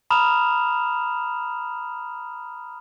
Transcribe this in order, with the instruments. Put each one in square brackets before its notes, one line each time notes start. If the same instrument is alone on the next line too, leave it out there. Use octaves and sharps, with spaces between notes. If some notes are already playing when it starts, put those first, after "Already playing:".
[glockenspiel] A#5 B5 D#6 F6 E7 F7